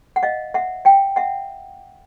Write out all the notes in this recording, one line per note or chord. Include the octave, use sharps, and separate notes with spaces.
F#5
D#5 F5
E5 F#5
F5 G5
E5 F#5